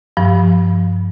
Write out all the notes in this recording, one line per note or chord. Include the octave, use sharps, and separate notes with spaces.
G2 F3